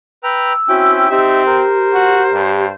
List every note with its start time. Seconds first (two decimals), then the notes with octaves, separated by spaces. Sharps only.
0.23 B4 G5 A#5 E6
0.69 C4 C#4 E4 F#4 G5
1.10 C4 D#4 G4 E5
1.46 A#4 C5
1.93 F#4
2.33 G2